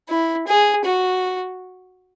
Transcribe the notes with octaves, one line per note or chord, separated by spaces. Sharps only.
E4
G#4
F#4